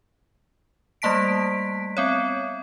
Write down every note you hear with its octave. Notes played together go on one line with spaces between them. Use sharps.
G3 A3 A#3 A5 B6 D7
B3 C4 C#5